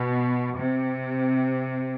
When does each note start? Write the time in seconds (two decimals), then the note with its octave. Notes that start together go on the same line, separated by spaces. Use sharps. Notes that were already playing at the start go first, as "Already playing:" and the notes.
Already playing: B2
0.57 C3